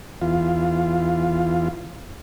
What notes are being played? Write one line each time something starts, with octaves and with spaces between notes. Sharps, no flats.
E2 F4